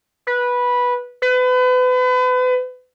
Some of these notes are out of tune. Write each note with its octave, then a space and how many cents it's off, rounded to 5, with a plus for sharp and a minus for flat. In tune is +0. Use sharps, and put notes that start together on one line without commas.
B4 -10
B4 +35